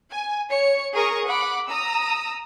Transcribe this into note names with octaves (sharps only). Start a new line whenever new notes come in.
G#5
C#5 C#7
G#4 A#4 C#6 D#6
F#5 B5 D6
A#5 D#6 E6